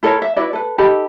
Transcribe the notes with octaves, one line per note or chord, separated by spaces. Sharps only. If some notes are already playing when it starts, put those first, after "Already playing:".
E4 A4 A#4 C#5
E5
E4 F#4 B4 D5
A4 B4
D#4 G4 A4 B5